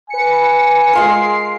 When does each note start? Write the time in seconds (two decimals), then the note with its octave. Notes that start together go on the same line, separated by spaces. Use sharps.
0.10 B4 G#5 C#7
0.93 G#3 F4 A#4 C7